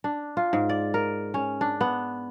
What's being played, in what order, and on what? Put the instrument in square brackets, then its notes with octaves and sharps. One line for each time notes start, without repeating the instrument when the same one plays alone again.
[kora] D4
F4
G#2
D5
A#4
C#4
D4
B3